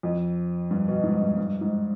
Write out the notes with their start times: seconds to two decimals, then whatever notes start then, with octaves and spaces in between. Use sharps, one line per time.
0.03 F2
0.71 G2
0.88 B2
1.04 G#2
1.21 G2
1.37 G2
1.61 G#2